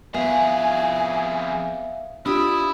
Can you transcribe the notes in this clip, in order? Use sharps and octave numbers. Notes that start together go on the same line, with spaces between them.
F2 B3 G#4 E5 F5 G#5
D4 E4 F4 G4 D#6